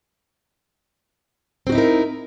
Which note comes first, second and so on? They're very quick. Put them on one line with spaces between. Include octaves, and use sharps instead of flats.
C4 F#4 D#4 E4 A#4